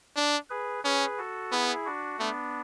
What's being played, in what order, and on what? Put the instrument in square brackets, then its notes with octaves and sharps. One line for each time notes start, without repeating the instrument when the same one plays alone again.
[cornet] D4
[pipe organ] G#4 B4
[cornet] C#4 [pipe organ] G#4 B4
[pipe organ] F#4 A4
[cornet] B3 [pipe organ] E4 G#4
[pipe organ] D4 F#4
[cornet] A3 [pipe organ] B3 D4